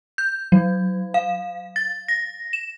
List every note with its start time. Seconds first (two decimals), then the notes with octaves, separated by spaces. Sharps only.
0.18 G6
0.52 F#3
1.14 F5
1.76 A6
2.08 A#6
2.53 E7